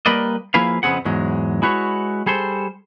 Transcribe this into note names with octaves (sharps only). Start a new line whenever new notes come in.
G3 A#3 A#4 B4 D5 D#5
F3 A#3 E4 G#4 B4 F5
F2 C#3 B3 C4 G#4 F#5
E2 G#2 F#3 G#3
G#3 E4 F#4 B4 C#5
G3 G#4 A4 C5